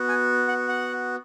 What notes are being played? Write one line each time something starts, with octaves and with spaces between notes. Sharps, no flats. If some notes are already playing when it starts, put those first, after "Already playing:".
Already playing: B3 F#4
G#5
F#5
F#5